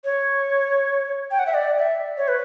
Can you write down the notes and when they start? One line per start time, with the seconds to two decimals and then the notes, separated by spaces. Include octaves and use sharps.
0.04 C#5
1.31 G5
1.39 F#5
1.47 E5
1.54 D5
1.79 E5
2.18 C#5
2.28 B4